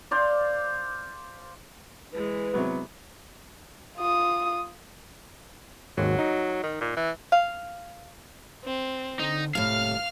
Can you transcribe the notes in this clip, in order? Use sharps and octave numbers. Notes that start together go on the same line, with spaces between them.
C5 D5 F5
E3 G#3 B4
C3 F#3 B3
F4 D#6
G#1 D#2 F#3
D#4
D#3
A#2
E3
F5
C4
D3 D#4
D#1 A2 C3 F5 F6